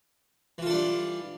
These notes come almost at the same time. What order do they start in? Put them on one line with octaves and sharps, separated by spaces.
E3 F4 A4 D4 G3